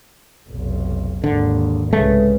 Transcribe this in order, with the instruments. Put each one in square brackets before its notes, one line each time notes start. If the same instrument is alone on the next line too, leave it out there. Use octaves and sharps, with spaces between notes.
[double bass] F1 B1
[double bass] G#1 D#2 [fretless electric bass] D3
[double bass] C2 C#3 [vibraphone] G#3 B4 [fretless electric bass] A3